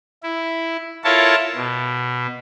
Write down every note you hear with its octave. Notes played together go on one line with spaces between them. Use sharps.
E4
E4 F4 A4 A#4 C#5 A5
B2